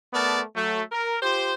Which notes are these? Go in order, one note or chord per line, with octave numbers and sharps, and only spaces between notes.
A3 B3 A#4 D5 A5
F#3 A3
A#4
F4 G4 C5